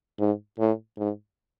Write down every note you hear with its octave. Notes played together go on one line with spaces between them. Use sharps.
G#2
A2
G#2